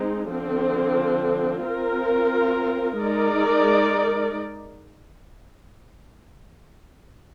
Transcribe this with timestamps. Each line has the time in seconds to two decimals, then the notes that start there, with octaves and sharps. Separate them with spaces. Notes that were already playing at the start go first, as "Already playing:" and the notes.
Already playing: G#3 C4 D#4
0.32 D3 F3 C4
1.66 C4 F4 A#4
3.00 G#3 D#4 A#4 D5